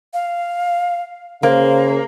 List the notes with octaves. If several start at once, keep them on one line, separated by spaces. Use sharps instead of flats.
F5
C#3 A#3 C5